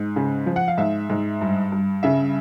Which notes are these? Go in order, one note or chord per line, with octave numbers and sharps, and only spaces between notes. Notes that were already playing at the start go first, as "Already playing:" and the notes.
Already playing: G#2
C#3
F3
F#5
F5
G#2 E5
G#2
G2
G2
C#3 E5